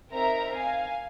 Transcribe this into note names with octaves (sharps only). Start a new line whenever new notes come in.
C4 D#4 A#4 E5 A#5
F5 G#5